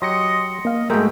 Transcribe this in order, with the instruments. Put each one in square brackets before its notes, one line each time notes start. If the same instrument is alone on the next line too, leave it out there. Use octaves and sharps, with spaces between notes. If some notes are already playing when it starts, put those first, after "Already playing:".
[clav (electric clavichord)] F#3 G4 [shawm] D#5 [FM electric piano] C6 A#6 C#7
[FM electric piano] A#3 F5 [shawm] D#5
[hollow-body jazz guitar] G#2 A3 [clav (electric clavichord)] G#3 F#4 [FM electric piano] A#4 A#5 [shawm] G5